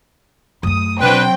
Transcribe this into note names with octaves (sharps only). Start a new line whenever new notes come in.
F#2 A3 D#6
B2 F#3 C4 D4 B4 G5